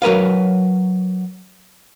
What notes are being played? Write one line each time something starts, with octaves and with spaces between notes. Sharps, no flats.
F#3 A#4 B4 F5